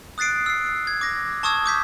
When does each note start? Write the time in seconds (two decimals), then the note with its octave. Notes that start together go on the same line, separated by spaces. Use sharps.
0.18 D#6 F#6 A6 C7 D7
0.46 E6 C7
0.87 G#6
1.01 D6 A#6
1.43 A5 C#6 D#6 E6 G#6
1.66 D6 G6 B6